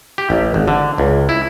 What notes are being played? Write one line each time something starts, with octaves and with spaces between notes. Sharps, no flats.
G4
A1
G#1
D3
C#2
E4